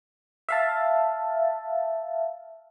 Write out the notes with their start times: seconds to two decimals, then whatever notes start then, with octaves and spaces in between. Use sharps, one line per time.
0.49 E5 F5 A5